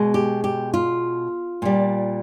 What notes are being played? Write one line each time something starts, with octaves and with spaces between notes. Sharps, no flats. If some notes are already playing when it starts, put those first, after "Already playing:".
Already playing: B2 G#3
G4
G4
F4
A#2 G3